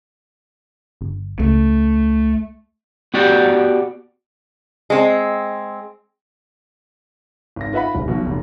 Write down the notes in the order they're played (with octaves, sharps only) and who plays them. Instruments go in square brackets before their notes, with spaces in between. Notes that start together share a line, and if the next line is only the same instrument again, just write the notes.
[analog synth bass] G1
[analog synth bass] C#2 [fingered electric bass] A3
[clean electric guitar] B3 F#4 G4 D5 F#5
[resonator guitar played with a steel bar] G#3 C4
[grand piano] G#1 A#6
F4 B4 E5 F#5 B5
D#1
B1 B2
F1